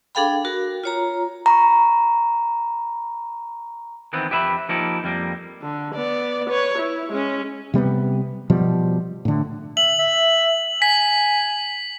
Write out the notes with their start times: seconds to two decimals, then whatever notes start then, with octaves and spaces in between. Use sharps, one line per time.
0.15 D4 G#4 A4 F5 G5 B5
0.45 F#4 A#4
0.84 F4 C#5 A#5
1.46 A#5 B5 C#6
4.13 D#3 E3 B3 C4
4.30 F2 G4 B4 E5 B5
4.69 F3 A#3 D#4 E4 G4
5.04 F2 G3 G#3 A#3
5.62 D3
5.95 B3 D5
6.50 B4 C#5
6.78 E4
7.10 G#3 C#4
7.74 C3 G3 A#3 B3
8.50 B2 F3 G3
9.25 A2 D3
9.77 E5 F#7
9.99 E5
10.82 G#5 B6